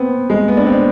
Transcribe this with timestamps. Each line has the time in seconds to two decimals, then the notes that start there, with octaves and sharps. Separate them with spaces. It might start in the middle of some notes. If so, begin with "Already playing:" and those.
Already playing: B3 C4
0.30 G#3
0.48 B3
0.57 D4
0.66 C4